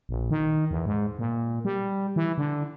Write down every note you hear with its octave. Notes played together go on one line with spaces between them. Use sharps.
A#1
D#3
E2
G#2
A#2
G3
E3
D3